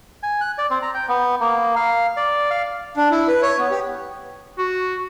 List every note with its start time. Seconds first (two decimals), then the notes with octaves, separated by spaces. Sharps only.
0.23 G#5
0.41 F#6
0.58 D5
0.70 C4
0.82 A#5
0.94 G5
1.09 B3
1.40 A#3
1.76 F5
2.17 D5
2.50 F5
2.97 D4
3.11 E4
3.28 B4
3.42 C#5
3.59 B3
3.71 G4
4.58 F#4